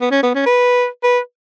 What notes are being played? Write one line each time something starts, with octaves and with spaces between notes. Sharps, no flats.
B3
C#4
B3
C#4
B4
B4